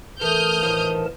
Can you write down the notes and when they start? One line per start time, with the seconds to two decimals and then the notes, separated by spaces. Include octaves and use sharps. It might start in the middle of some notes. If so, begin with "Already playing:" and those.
0.21 E3 A3 A#4 A5 D#6 F6 G6
0.62 A2 D#3 F3